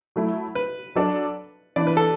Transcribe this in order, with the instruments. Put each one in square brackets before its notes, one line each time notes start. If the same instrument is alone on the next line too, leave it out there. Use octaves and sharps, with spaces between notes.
[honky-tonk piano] F#3 A3 E4
[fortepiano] B4
[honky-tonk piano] F#3 D4 A4 D5
[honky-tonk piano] E3 B3 D4 [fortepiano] D5
[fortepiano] B4
A4